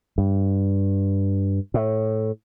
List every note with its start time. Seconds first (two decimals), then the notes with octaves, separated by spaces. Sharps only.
0.18 G2
1.74 A2